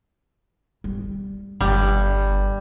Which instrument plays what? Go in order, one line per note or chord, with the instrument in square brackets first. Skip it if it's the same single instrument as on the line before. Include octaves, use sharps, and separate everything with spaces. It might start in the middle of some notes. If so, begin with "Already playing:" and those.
[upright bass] G3
[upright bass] G1 [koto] G3